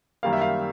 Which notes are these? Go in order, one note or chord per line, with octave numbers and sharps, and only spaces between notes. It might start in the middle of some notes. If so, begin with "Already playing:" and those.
F#2 D#3 G3 A#3 F5
E5
F5